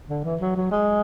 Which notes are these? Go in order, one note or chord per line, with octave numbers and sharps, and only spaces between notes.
D3
E3
F#3
F#3
G#3